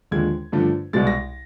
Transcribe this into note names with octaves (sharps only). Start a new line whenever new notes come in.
D#2 D3 F3 G#3 G#6
G2 D3 F3 A3
C2 B2 G#3 A6
A#6